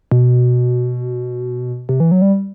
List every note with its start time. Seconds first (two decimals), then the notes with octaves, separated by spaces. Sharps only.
0.11 B2
1.89 C3
2.00 E3
2.11 F#3
2.22 G3